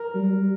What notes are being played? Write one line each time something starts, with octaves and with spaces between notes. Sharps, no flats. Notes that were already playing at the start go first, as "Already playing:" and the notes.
Already playing: A#4
G3